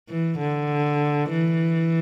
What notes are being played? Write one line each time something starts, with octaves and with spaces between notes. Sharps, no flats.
E3
D3
E3